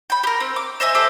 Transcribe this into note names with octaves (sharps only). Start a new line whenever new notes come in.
G5 B5
G4 A#4
C4
D6
C5 D#5 E5 G#5
G4 A4 C5 E5